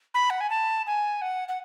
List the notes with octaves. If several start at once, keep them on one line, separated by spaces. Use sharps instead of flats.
B5
F#5
G#5
A5
G#5
F#5
F#5